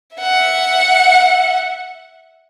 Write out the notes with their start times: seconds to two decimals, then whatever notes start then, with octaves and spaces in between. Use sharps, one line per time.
0.17 E5 F#5